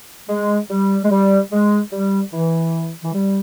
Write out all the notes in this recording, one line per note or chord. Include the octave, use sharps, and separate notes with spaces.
G#3
G3
G#3
G3
G#3
G3
E3
E3
G3